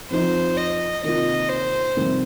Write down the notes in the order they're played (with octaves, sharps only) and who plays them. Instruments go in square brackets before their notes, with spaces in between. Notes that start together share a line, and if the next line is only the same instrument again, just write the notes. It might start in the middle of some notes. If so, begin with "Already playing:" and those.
[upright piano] F2 F3 D#4 [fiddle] C5
[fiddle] D#5
[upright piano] C3 D#3 A#3 F4 [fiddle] D#5
[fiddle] C5
[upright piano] F2 C3 D#3 G3 C4